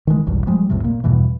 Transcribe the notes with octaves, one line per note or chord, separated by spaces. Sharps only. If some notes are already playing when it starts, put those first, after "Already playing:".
D#3 E3 G#3
F#1 B1 E2 G2
F3 G3 G#3
A1 E2 A2 C3
A#2 A#3
E2 G2 B2 E3